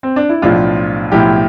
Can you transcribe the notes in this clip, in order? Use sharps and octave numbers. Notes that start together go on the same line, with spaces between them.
C4
D4
E4
B1 A2 F3 D4 F4
B1 A2 F3 E4 G4